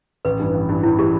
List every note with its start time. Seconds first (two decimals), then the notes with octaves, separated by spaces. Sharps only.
0.25 A1 B4
0.39 G2 E3
0.54 A1
0.69 G2 E3
0.83 A1 E4
0.98 E3 G4